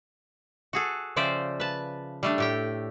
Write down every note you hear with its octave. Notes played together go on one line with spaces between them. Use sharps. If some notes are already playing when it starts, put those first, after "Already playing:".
F#4 G#4 A4
C#3 F3 C5 D5 E5 G5
B4 A5
G3 A3 D4
A2 G4 G5